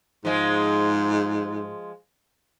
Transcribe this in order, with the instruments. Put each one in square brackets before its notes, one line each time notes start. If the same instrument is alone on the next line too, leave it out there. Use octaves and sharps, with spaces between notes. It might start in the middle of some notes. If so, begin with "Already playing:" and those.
[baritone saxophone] G#2 [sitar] F3 G#3